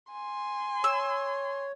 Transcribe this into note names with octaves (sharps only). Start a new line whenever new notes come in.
G#5 C6
C#5 E6